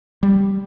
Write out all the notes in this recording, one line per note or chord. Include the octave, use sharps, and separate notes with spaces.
G3